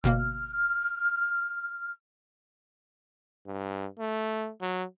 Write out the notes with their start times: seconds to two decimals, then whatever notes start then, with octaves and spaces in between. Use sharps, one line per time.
0.04 G1 B2 A#3 F6
3.47 G2
3.99 A3
4.61 F#3